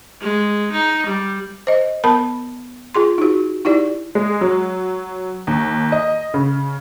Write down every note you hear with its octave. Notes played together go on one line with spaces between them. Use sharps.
G#3
D#4
G3
C5 D#5
B3 A#4 A5 B5
F4 G#4 C6
D#4 F#4
D#4 E4 G4 D5
G#3
F#3
D#2
D#5
C#3